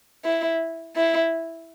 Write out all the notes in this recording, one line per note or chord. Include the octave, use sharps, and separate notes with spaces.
E4
E4